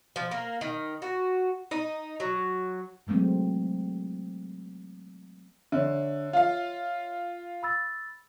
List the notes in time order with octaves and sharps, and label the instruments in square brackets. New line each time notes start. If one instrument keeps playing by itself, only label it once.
[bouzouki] F3
A#3
D#3
F#4
D#4
F#3
[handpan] E3 F#3 G#3 A3 C4
[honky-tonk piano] D3 [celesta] C#5 D#5 E5
[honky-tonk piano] F4 F5
[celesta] B5 E6 A6